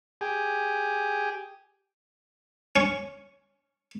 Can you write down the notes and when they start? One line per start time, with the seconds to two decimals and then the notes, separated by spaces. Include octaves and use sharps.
0.21 G4 G#4
2.76 C#4 C#6